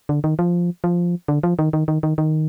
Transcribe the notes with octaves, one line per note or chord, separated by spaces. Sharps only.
D3
D#3
F3
F3
D3
F3
D#3
D#3
D#3
D#3
D#3